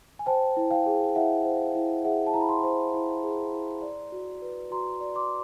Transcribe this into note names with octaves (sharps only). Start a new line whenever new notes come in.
G#5
C5 G5 A5
E4
F5 G5
G#4
E4 E5 F#5
C5
E4
G#4 E5 F#5
A5
E4 A#5
B5
A#5 C6
C5
E4
G#4
E4
D5
F#4
B4
F#4 A#5 C6
D5
C6 D6